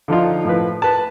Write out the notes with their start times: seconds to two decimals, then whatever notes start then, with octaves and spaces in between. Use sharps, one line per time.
0.08 D3 F3 D#4 F4
0.45 A2 F3 B4
0.82 B4 A5